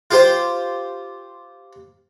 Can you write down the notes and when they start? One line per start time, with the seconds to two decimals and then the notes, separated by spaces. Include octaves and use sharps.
0.11 F4 G4 C5